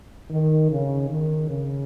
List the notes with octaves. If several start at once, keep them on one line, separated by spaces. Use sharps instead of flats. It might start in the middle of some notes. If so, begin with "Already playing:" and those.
D#3
C#3
D#3
C#3